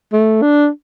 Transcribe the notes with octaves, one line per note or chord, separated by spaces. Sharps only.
A3
D4